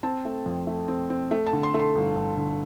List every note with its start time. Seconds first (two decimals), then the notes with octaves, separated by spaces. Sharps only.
0.03 C4 A5
0.25 A3
0.46 F2
0.67 A3
0.88 C4
1.10 C4
1.31 A3
1.46 A5
1.53 D3
1.63 C6
1.74 A3
1.79 C6
1.95 G1
2.16 G1
2.37 D3